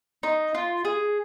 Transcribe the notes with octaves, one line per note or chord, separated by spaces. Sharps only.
D#4
F4
G#4